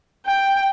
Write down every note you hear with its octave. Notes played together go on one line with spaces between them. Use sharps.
G5